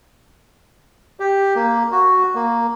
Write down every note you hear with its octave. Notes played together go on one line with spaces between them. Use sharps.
G4
A#3
F#4
A#3